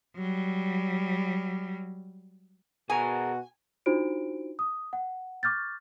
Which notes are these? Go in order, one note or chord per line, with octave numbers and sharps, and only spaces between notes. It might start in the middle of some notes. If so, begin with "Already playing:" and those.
F#3 G3
B2 F#4 G#4 A#4 G#5 A#5
D4 D#4 F4 F#4 C5 D7
D#6
F#5
C#6 D6 F6 G6 A6